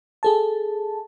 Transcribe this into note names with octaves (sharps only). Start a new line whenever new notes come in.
G#4 A4 A5